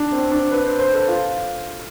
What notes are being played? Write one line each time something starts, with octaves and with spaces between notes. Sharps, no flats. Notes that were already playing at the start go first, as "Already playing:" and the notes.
Already playing: D4
C4
D4
B4
C5
C5
A4
F4